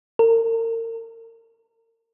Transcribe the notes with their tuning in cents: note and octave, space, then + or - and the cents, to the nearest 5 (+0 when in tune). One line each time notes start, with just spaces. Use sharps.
A#4 -35